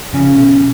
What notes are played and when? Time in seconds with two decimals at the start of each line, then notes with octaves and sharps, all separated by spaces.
0.13 C#3 F3 C#4
0.36 B2 D3